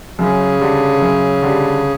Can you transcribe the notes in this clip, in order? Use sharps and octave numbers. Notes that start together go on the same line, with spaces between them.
F#2 C#3
D3 G3
F#2
D3 G3